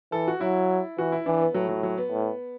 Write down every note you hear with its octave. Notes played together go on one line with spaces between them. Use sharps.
E3 A4
F#4
F#3 E4
E3 F#4
E4
E3 D4
B3
A2 F#3
F#3
F#3
B3
A2